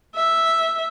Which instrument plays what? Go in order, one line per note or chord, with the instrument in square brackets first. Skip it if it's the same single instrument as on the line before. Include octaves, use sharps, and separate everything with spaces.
[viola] E5